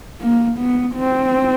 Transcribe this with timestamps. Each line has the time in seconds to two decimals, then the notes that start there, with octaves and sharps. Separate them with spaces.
0.21 A#3
0.58 B3
0.96 C4